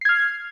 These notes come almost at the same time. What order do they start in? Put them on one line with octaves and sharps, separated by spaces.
C7 G#6 F6